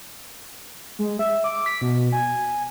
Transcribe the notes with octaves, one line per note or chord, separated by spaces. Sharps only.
G#3
E5
D6
B6
B2
G#5